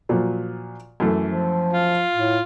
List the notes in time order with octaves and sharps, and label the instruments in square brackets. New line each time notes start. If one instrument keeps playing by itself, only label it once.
[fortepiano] A#2 F3 F#3
F#2 E3 A3
[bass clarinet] F3
[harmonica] F4
[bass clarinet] A2